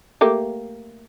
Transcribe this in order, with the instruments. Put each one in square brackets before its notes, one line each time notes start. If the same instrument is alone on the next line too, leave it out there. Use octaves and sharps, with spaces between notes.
[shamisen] A3 A#3 G4